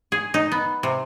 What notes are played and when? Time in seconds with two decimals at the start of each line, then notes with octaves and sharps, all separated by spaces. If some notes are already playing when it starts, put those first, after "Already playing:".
0.12 G#4
0.34 D#4
0.52 B3
0.83 C3